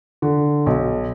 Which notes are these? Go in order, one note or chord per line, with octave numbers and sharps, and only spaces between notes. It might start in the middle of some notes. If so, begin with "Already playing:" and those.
D3
B1